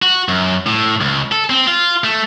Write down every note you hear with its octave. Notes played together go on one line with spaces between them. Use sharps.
F#4
F#2
A2
C#2
A4
C4
F4
A3